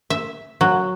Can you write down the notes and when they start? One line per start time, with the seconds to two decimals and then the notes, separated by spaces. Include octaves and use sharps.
0.10 E5
0.61 F#3